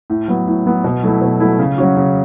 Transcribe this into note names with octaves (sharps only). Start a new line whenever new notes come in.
A2
F#3 B3
A2
F#3 B3
B2
F#3 A3 E4
B2
F#3 A3 E4
C#3
F#3 C#4 F#4
C#3